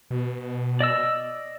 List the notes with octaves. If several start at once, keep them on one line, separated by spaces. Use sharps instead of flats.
B2
D5 D#5 E6